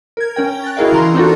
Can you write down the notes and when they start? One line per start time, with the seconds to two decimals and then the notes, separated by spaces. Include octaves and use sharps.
0.17 A#4 G#6
0.36 C#4 A#4 G5
0.64 F#6 A6
0.77 E4 F#4 G#4 A#4 D#5 F5
0.92 E3 A#5 C6
1.14 C4 D4 D#4 F4 F#4 A4